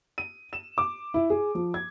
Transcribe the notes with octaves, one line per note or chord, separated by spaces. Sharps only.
D#7
E7
D6
E4
G#4
F3
G#6